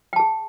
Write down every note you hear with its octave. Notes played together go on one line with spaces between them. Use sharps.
G#4 G5 A5